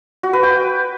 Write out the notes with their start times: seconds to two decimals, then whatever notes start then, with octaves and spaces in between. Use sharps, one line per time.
0.23 F#4
0.33 B4
0.43 G5